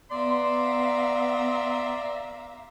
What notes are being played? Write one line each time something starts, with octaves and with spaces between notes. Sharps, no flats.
B3 D5 E5 F5 A#5 C6